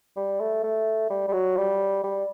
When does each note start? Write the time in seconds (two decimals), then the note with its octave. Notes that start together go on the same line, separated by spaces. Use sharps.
0.16 G3
0.40 A3
0.63 A3
1.10 G3
1.28 G3
1.33 F#3
1.57 G3
2.03 G3